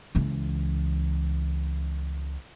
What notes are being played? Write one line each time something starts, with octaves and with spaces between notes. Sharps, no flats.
C#2 E3